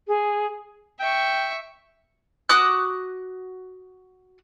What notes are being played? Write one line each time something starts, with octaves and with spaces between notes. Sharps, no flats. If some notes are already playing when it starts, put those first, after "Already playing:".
G#4
E5 G5 C#6
F#4 D6 D#6 F#6